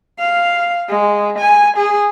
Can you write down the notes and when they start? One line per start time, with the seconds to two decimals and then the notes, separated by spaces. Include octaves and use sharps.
0.20 F5
0.89 G#3
1.39 G#5
1.77 G#4